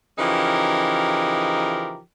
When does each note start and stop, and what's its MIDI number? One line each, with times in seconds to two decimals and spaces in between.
0.18 2.00 49
0.18 2.00 52
0.18 2.00 53
0.18 2.00 63
0.18 2.00 67
0.18 2.00 70